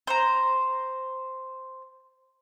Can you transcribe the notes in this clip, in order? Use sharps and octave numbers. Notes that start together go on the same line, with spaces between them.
C5 A#5